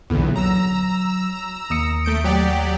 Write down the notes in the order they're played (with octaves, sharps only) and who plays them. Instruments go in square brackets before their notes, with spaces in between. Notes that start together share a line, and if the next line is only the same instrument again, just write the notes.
[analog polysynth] B1 E2 [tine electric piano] A#2 D3
[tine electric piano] F#3 [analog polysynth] A#5 E6
[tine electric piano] D#2 D#6 C#7
[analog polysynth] A3 G6 D7
F#3 G4 D5